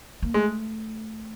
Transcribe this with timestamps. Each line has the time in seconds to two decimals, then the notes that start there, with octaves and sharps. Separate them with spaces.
0.22 A#3
0.34 G#3 A3